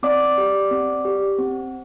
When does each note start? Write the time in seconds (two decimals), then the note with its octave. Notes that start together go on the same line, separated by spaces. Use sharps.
0.03 C4 D5 D6
0.38 G4
0.71 C4
1.05 G4
1.39 C4